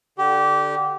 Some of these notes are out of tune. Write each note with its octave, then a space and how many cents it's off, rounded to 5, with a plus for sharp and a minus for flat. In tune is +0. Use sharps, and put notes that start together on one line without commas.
D3 +0 G4 -20